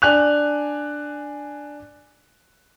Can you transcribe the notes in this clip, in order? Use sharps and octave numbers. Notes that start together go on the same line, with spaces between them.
D4 G#5 F#6 F7